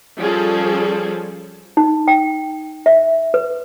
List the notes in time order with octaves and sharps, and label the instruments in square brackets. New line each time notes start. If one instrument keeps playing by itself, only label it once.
[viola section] F3 G3 C#4 G#4 A4
[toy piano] D#4
G5
E5
B4